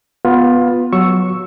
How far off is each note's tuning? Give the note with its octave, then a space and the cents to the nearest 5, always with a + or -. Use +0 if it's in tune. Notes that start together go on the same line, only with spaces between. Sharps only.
B3 +0 F4 +15
F#3 +0 C#6 +0 E6 +0